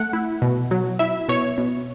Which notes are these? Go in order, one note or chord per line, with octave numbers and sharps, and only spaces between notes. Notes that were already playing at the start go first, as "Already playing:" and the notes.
Already playing: A3 F#5
E4
B2
F#3
E4 E5
B2 C#5
B2